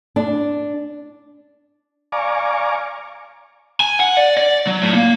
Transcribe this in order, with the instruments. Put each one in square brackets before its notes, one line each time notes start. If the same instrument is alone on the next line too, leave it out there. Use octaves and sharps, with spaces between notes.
[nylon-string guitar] D4
[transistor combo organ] D5 F5 G#5 A#5 C#6 D6
[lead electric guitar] G#5
F#5
D5
D5
F#3
A2
A#3